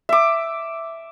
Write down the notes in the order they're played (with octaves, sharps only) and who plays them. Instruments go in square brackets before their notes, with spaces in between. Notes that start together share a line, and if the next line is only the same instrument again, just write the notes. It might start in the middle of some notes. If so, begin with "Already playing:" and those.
[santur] E5 D6